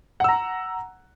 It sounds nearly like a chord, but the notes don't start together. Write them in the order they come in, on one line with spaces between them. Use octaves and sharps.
F#5 E6 A#5